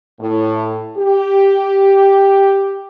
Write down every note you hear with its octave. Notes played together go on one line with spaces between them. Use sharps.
A2
G4